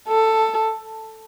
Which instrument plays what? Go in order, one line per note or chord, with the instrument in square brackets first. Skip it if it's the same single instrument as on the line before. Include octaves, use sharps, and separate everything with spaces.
[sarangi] A4